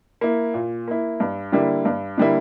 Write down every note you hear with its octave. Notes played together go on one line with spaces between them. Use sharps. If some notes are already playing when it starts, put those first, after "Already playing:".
A#3 E4
A#2
A#3 E4
G2
D3 G3 A#3 E4
G2
D3 G3 A#3 E4